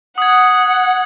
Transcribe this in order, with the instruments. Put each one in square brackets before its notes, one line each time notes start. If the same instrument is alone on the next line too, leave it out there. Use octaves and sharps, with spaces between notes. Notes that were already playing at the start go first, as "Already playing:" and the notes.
[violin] F#5 [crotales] D#6 G#6